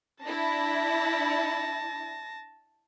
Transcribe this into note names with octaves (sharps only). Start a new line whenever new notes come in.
D4 E4 A5 A#6